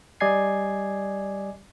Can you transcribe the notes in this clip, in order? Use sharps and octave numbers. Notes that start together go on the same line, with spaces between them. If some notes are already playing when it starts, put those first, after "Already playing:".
G3 D5 D#5 G#5 G#6 C7